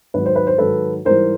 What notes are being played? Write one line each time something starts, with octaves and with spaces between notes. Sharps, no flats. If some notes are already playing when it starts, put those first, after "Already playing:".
G#2 D#3 F#3 B4
C5
B4
C5
G#2 D#3 F#3 A4 B4
G#2 E3 G3 A#4 C5